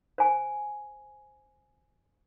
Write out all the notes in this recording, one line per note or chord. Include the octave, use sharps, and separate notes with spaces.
C5 G#5